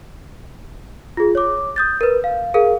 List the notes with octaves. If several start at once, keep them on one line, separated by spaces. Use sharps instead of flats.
F4 G#4
C#5 D6
D#6 G6 A6
A#4 B4
F5
G#4 A#4 F5